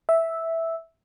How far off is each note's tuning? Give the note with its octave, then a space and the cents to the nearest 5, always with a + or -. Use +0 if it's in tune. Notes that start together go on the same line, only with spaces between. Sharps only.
E5 -5